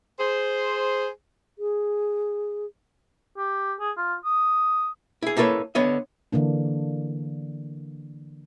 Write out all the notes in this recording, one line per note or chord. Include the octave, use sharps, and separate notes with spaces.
G#4 C5
G#4
G4
G#4
F4
D#6
E4 G#4
A#3 E4 A4 B4 C#5
D3 B3 C#5 D#5
D3 E3 A#3 D4